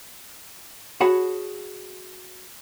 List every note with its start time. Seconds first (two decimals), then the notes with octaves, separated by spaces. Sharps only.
1.01 F#4 G#4 C#5 F#5 A5 B5